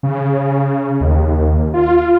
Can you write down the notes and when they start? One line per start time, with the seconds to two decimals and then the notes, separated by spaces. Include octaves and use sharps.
0.03 C#3
1.01 D#2
1.74 F4